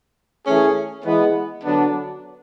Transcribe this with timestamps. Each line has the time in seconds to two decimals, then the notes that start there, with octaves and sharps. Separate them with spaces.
0.46 E3 A3 C#4 G#4
1.05 E3 G#3 B3
1.64 D3 F#3 B3 D4